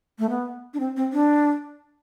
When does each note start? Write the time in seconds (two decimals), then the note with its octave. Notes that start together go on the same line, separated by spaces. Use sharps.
0.19 A3
0.30 B3
0.74 D4
0.80 C4
0.96 C4
1.13 D4